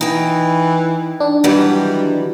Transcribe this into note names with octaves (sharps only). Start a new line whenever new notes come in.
E3 D#4 G5
D4
D#3 E3 F#3 G3